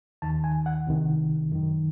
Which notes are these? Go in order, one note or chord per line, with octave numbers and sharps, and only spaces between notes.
D#2 D#3 A5
G#5
F#5
C2 C3 D#3
F#2 D#3